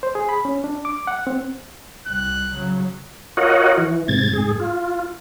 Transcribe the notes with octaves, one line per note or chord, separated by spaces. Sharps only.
C5
G#4
B5
C#4
D4
D6
F#5
C4
C2 G3 F#6
C#3 F#3
F4 F#4 A#4 C#5 D#5 F#5
E3
G#2 C3 G#6 A6
G#2 G#4
F4